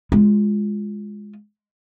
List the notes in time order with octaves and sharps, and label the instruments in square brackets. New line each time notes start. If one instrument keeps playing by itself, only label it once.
[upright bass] G#3 F4